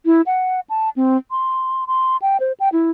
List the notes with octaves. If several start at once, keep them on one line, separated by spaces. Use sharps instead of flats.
E4
F#5
A5
C4
C6
C6
G5
C5
G5
E4